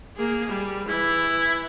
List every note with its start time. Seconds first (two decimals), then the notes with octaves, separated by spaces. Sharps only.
0.16 A#3 G#4
0.50 G3
0.89 E3 E4